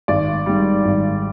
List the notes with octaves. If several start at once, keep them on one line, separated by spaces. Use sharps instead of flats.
G#1 D5
G#2 G3
G#1